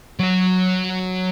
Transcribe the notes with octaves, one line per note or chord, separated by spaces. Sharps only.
F#3 C#5